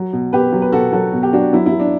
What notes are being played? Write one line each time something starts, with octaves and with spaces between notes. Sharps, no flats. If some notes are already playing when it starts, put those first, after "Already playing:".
Already playing: F#3
B2
B2 G4 B4
F#3
B4
B2 F#4 A4
F#3 F#4 A4
B2
G4
F#3 D4 F#4
F#3 E4
E4
F#3
D4